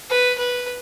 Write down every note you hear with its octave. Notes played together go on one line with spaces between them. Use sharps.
B4
B4